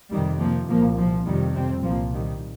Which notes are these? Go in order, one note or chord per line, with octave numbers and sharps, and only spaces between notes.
F2 C3 D#3 G3
F3 A#3
C2 A#2 F3 A#3
F3
F2 C3 D#3 G3
G3 C4
C2 A#2 F3 A#3
D#3 G3